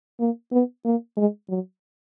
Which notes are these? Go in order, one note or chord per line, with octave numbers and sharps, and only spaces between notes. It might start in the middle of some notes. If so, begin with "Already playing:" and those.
A#3
B3
A#3
G#3
F#3